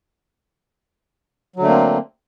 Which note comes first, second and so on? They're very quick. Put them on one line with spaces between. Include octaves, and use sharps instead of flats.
F#3 D3 A3 A#3 C4